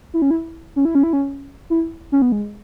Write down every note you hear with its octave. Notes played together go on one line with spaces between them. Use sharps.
E4
C#4
E4
C#4
E4
C#4
E4
C#4
E4
C#4
B3
G#3